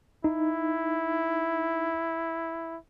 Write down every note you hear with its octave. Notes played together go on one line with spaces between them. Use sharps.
D#4 E4